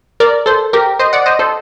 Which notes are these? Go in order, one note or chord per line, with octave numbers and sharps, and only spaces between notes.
A#4 D5
A4 C5
G4 A#4
C5 D#5
D5 F#5
C5 D#5
A4 C5